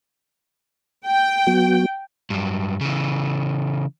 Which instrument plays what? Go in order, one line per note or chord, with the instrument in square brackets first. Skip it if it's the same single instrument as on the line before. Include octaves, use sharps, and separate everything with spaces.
[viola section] G5
[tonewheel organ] F#3 B3 F#4
[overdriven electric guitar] G2 F#3
C#3 E3